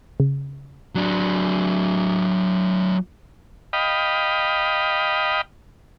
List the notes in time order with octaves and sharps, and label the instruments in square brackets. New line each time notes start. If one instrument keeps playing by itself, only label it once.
[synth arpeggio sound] C#3
[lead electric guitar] F#3 D4
[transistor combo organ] D#5 F5 G5 B5